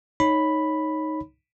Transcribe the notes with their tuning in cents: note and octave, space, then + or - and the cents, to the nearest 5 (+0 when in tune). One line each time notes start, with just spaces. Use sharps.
D#4 +0 C#5 -5 B5 +0